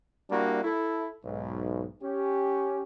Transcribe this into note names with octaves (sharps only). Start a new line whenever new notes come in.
G3 A#3 D4 E4 F#4
E4 A4
B1 G#2
C#4 G4